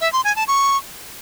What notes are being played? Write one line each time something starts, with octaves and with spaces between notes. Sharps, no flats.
E5
C6
G#5
A5
C#6